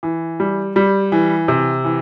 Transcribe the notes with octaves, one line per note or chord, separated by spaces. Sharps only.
E3
G3
G3
E3
C3
E3